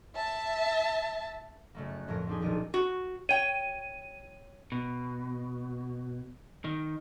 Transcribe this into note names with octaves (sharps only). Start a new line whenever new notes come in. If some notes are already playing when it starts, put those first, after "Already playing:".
E5 A5
F#1 A3 A#3
F#6
F2 A2 F3 A#4
A#3 C4 D4 D#4 G4 G#4
D#1 B1 D4 A#4 D#7
F#4
C#5 G5 D#7
B2
D#3